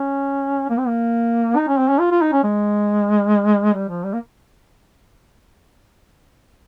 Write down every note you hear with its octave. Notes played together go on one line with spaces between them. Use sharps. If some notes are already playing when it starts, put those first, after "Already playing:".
Already playing: C#4
A#3
C4
A#3
D#4
C#4
C4
C#4
F4
F4
D#4
C#4
G#3
G3
F3
G3
A#3